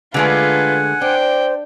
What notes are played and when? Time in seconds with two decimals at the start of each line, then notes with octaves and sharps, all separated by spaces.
0.14 D3 G#3 A3 F4 B4 F#5 G#5
1.01 D4 C5 G5